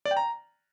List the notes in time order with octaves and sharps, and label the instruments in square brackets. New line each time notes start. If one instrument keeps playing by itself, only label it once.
[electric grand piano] D5
G5
A#5